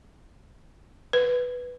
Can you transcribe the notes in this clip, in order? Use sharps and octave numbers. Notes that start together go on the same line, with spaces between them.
B4